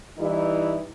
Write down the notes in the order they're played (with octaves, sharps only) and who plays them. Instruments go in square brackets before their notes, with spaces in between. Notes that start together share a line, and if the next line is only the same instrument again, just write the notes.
[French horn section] E3 G3 D#4 E4